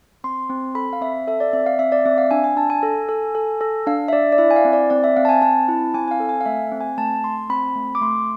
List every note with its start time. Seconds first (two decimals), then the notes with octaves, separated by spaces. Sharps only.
0.24 C4 C6
0.50 C4
0.75 A4 B5
0.93 F5
1.01 C4 E5
1.27 A4 E5
1.40 D5
1.53 C4 E5
1.66 F5
1.79 C4 E5
1.92 D5
2.05 C4 E5
2.18 F5
2.31 D4 G#5
2.44 G#5
2.57 D4 A5
2.70 G#5
2.83 A4
3.09 A4
3.35 A4
3.61 A4
3.87 D4 F5
4.08 E5
4.13 D4 D5
4.32 D5
4.38 E4 E5
4.51 G#5
4.56 F5
4.65 C4
4.73 D5
4.90 C4 D5
5.04 E5
5.16 C4 F5
5.25 A5
5.29 G#5
5.42 C4 A5
5.68 E4
5.94 C4 G#5
6.08 G#5
6.11 F5
6.20 A4
6.29 G#5
6.41 F5
6.46 A3 E5
6.72 C4
6.81 G#5
6.98 A3 A5
7.24 A3 C6
7.50 C4 B5
7.76 A3
7.95 D6
8.01 A3 C6